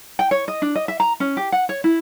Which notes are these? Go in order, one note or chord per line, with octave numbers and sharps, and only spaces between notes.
G5
C#5
D#5
D4
D#5
E5
A#5
C#4
G4
F#5
C#5
E4